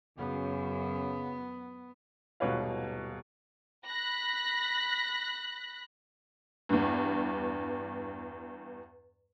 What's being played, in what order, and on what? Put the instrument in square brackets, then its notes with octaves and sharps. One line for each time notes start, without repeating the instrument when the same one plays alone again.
[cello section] F#2 [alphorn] C#3 [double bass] B3
[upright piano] D#1 G#1 B2 B4 C#5 F5
[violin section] B5 F#6 A#6 B6
[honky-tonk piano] E2 G2